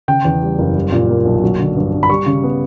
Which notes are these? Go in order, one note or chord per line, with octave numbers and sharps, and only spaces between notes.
C#3 G5
E2
G3
F#1
G3
A#2
A#3
B1
F#3
D3
G2
G2
B5
G3 C#6
C#3
B3